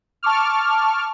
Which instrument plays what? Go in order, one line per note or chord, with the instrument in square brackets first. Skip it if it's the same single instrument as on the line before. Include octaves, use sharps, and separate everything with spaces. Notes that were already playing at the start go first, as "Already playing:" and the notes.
[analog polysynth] A5 C#6 D6 F6